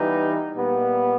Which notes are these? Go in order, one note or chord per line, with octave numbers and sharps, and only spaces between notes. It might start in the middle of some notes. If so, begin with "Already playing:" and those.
Already playing: E3 G3 B3 D#4
A#2 G3 B3